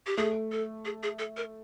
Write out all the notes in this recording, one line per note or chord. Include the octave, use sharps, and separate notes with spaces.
G4
A3 G#4
A4
G#4
G#4
A4
A#4